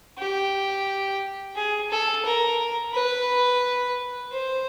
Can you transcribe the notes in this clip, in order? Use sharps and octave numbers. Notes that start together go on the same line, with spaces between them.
G4
G#4
A4
A#4
B4
C5